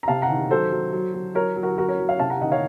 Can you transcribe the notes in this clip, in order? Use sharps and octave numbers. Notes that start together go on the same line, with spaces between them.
A#5
C3 F5 A5
F#5 A#5
D#3
F#3 A4 C5
F#3
F#3
F#3
F#3 A#4 C#5
F#3
F#4 A#4
F#3 F#4 A#4
A#4 C#5
F#3
C#5 F5
C3 F5 A5
F#5 A#5
D#3 D#5 F#5
C#5 F5